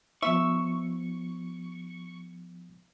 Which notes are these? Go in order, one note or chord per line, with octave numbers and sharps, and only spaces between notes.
F3 B3 D#4 E5 C#6